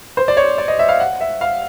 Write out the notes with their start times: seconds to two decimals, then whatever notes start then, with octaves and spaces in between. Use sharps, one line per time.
0.17 C5
0.28 D5
0.37 C#5
0.58 D5
0.68 D#5
0.79 E5
0.89 F5
1.00 F#5
1.21 E5
1.41 F5